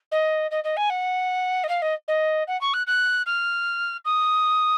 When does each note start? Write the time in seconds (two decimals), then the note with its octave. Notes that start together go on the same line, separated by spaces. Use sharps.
0.11 D#5
0.51 D#5
0.64 D#5
0.76 G#5
0.90 F#5
1.64 D#5
1.68 F5
1.82 D#5
2.08 D#5
2.47 F#5
2.61 C#6
2.73 F#6
2.87 F#6
3.26 F6
4.05 D#6